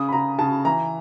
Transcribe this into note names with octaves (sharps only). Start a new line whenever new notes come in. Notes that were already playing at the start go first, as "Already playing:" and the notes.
Already playing: C#3 D#6
B5
C#3 A#5
C#3 A5
E3 A#5